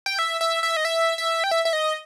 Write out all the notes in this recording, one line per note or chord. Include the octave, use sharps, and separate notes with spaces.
G5
E5
E5
E5
D#5
E5
E5
G5
E5
E5
D#5